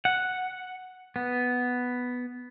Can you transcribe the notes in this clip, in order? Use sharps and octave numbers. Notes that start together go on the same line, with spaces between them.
F#5
B3